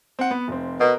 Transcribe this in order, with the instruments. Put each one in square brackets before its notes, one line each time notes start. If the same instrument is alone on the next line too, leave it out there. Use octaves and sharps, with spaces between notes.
[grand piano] C4 F#5
B3
F1 C4
[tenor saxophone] B2 [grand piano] A#4